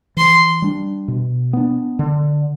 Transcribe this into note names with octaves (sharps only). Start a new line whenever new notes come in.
E3 C6
G3 D4
B2
B3 D4
D3